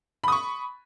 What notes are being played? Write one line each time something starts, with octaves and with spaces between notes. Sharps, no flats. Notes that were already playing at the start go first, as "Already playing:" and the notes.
B5 C#6 D#6